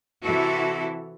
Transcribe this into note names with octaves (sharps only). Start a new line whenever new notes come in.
C3 E3 E4 F#4 A4